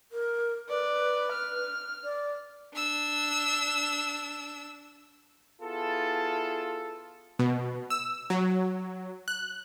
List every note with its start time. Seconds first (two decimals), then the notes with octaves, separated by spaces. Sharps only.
0.12 A#4
0.69 B4 D5
1.32 F6
2.04 D5
2.74 D4 E6
5.62 B3 E4 F4 G#4 A4
7.39 B2
7.90 E6
8.30 F#3
9.28 F#6